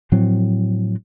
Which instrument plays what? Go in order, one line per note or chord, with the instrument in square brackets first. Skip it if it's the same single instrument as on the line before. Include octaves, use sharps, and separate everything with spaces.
[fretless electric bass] A2 F3 F#3 C4